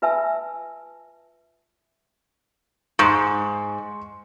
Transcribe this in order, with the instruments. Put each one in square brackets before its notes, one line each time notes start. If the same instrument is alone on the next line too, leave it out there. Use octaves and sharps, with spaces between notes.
[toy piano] F4 B4 E5 G#5 A5 E6
[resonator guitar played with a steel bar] G#2 [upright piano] C6 C#6